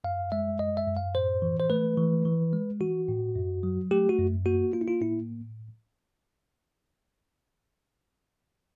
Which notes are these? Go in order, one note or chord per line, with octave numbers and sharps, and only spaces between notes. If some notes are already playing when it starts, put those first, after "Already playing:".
F#2 F5
G#3 E5
F#2 D#5
E5
F#2
F5
A2 C5
E3
C5
A3 B4
E3
E3
G#3
E3 F#4
A2
F#2
F#3
A3 G4
F#4
F#2
A#3 F#4
A#3 F4
E4
F4
A2 E4